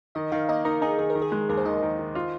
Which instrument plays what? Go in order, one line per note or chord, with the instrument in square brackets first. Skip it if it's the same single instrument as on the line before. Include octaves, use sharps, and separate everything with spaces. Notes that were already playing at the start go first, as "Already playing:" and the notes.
[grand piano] D#3 [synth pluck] D#5
[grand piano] D#3 [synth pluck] F5
[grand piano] A#3 [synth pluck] D#5
[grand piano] D#4 [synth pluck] A#4
[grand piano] D#4 [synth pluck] G#4
[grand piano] D#3 [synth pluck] G#4
[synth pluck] A#4
[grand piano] D#3
[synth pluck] G#4
[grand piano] G#3
[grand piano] D#2 [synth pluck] A#4
[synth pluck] C5
[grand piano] D#3 [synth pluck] D#5
[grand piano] D#3
D#3
F4